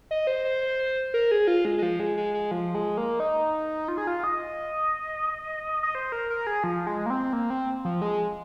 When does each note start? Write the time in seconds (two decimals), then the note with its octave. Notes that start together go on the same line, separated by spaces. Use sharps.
0.11 D#5
0.27 C5
0.45 C5
0.61 C5
0.79 C5
1.14 A#4
1.31 G#4
1.47 F4
1.65 G#3
1.78 G#3
1.83 F3
2.00 G#3
2.17 G#3
2.34 G#3
2.51 F3
2.75 G#3
2.97 A#3
3.20 D#4
3.88 F4
3.98 G#4
4.07 F4
4.24 D#5
5.83 D#5
5.95 C5
6.12 A#4
6.30 A#4
6.47 G#4
6.64 F3
6.87 G#3
7.06 A#3
7.10 C4
7.33 A#3
7.50 C4
7.85 F3
8.02 G#3